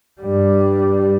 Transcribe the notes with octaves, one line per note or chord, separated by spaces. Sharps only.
G2 G3